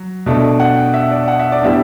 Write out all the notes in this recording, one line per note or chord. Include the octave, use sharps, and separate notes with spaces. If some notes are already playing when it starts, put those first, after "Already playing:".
Already playing: F#3
B2 A3 D4
F#5
G5
E5
D5
F#5
E5
D5
A2 G3 B3 D4 E5